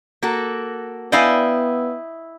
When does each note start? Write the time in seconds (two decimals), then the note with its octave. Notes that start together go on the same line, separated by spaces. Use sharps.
0.22 A#3 F#4 A4
1.12 B3 E4 D5 D#5 F5 G5 G#5